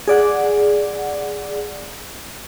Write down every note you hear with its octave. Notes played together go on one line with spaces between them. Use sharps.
G#4 D5 F#5